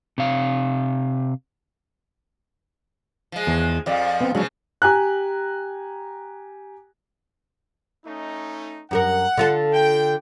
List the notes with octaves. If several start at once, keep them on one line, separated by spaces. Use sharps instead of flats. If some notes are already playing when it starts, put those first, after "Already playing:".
C3 F5
F3 G#3
E2
F2 F3 D5 D#5 F5
B3 C4
C#3 F3 F#3 G#3 D4
G4 G#5 A#5 F#6
A3 C#4 D#4
F#2 G4 A#4 F#5
D3 F4 A4
G5